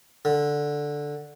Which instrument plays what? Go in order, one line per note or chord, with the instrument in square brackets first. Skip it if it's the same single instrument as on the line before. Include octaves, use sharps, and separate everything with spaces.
[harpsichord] D3